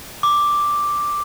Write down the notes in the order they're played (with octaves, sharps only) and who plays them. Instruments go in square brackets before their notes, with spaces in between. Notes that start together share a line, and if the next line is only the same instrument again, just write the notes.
[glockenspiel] D6